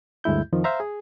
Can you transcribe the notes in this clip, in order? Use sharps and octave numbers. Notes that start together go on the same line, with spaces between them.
D2 G2 G#3 E4 G6
F2 D#3 F3
C5 E5 F5 A#5
G#4